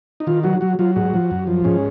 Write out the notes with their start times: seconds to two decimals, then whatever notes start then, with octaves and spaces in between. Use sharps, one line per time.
0.20 D#4
0.27 D#3 F4
0.44 F#3 F#4
0.61 F#3 F#4
0.79 F#3 F4
0.96 G#2 F#4
1.14 F3
1.31 F#2
1.47 F3
1.64 G#2 C#4